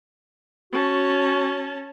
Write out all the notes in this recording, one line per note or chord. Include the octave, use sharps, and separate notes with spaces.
C#4 F#4 A5